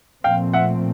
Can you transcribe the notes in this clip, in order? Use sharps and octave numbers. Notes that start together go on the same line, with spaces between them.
A#2 F3 A3 C4 F5 G5
E5 F#5